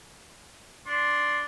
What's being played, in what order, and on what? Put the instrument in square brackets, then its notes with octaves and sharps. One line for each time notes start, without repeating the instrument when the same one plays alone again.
[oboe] D4 [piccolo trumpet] C6